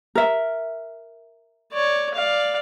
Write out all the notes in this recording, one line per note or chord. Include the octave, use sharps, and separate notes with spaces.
A#4 E5
C#5 D5
D5 F5